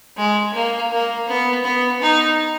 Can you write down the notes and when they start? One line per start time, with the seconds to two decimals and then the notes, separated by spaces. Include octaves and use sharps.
0.17 G#3
0.54 A#3
0.92 A#3
1.28 B3
1.64 B3
2.02 D#4